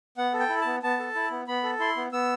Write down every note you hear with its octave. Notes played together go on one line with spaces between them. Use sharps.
B3 F#5
A4
G5
E4
B3 A5
B3 A5
A4
E4
B3
B3 B5
A4
E4 C6
B3
B3 E6